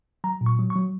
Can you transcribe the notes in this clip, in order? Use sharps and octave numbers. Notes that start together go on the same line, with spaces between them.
F#3 A#5
A#2
C#6
F#3
C#6
F#3